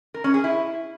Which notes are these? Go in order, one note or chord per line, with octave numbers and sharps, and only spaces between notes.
A#4
C#4
G#4
E4